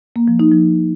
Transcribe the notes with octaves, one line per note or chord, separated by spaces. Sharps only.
A#3
F3
D#4
F3